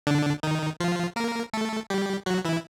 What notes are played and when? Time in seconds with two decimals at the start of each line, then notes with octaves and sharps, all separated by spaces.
0.07 D3 D4
0.43 D#3 D#4
0.80 F3 F4
1.16 A#3 A#4
1.53 A3 A4
1.90 G3 G4
2.26 F#3 F#4
2.45 E3 E4